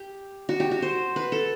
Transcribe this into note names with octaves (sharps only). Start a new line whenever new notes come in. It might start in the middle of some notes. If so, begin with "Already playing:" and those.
Already playing: G4
F#4
G4
F#4
C5
B4
A4